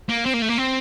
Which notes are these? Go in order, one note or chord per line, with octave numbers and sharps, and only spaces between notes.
A#3
C4
A#3
A3
A#3
C4